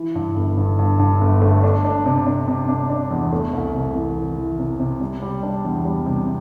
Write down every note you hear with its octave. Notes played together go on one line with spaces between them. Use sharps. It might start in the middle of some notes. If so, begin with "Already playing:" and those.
Already playing: E3
G2
G1
G2
G2
G2
G1
A3
D4
D4
C3
D4
C3
D4
D4
E2
A3
C2
C3
E3
E3
E3
C3
C3
G3
G3
D4
E2
G3
C3